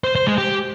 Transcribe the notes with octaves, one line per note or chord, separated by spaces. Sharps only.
C5
C5
G#3
G4